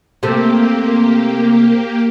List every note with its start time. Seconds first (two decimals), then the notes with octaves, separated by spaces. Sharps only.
0.23 C3 A3 A#3 G4